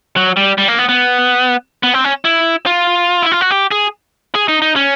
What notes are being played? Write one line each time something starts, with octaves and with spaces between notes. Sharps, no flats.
F#3
G3
G3
A#3
B3
B3
B3
C4
C#4
E4
F4
E4
F4
F#4
G4
G#4
G#4
D#4
D#4
C#4